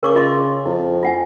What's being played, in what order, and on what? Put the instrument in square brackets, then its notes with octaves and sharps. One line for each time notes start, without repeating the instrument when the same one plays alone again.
[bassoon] C#3 [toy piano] A#4 C#6 D6
[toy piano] F4 D#5 C6
[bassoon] F2 [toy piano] E4
[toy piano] F4 F#5 G#5